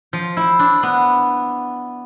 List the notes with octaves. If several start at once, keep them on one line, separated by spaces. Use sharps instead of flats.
F3
E4
D4
B3